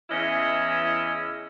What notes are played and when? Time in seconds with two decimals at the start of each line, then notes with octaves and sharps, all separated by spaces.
0.10 E2 C#3 E3 C#4 E4 D#5